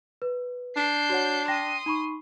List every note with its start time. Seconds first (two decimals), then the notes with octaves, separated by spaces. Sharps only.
0.22 B4
0.77 D4 G6 C7
1.10 F#4 C#5 F#5
1.48 G5 C6 D#6 A#6
1.86 D#4 B5 C#6